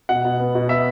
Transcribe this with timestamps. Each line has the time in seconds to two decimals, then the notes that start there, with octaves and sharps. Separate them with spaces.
0.09 B2 F#5
0.25 B2
0.40 B3
0.55 B2
0.69 B3 E5